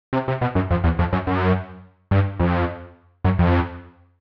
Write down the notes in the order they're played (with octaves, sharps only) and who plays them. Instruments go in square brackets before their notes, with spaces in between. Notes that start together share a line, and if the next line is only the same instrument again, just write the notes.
[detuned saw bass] C3
C3
B2
F#2
F2
E2
F2
F#2
F#2
G2
F2
F#2
F2